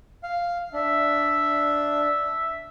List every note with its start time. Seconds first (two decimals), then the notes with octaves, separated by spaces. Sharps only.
0.23 F5
0.73 D4 E5